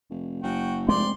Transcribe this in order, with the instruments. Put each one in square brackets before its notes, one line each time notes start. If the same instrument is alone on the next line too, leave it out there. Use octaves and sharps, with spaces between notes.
[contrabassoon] F1
[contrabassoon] F#1 [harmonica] F#4 G5
[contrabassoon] F1 [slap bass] G#3 C4 [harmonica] D5 C6